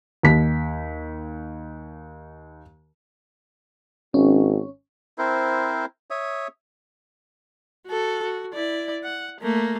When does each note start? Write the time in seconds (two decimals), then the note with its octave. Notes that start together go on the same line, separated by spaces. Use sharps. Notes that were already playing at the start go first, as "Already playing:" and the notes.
0.23 D#2 B6
4.14 G#1 C#4
5.18 C4 E4 A#4 C5
6.10 C#5 E5 D#6
7.87 F#4 A4
8.23 F#4
8.54 E4 D5
9.03 F#5
9.41 A3 A#3